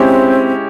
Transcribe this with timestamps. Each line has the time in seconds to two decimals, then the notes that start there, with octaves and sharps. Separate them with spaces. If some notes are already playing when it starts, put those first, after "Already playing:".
Already playing: G#3 C4 C#4 E4 G4